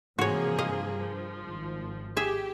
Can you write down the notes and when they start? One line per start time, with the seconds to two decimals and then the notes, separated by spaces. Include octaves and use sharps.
0.19 G#2 C3 E3 F3 A#3 F#4 G#4 C#5
0.58 G2 D#5 F5
0.97 F3
1.42 G#1
2.17 G4 G#4 E5